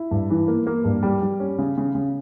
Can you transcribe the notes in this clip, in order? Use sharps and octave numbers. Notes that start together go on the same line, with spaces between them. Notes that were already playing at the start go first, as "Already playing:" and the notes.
Already playing: E4
G2
E3
A#3
A#3
G2
G3
G3
C#4
C#3
C#3
C#3